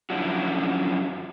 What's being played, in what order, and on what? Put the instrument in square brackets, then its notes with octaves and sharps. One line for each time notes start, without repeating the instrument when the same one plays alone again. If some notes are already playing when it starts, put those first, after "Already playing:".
[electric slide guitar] F#2 F3 C#4 D4 E4 F#4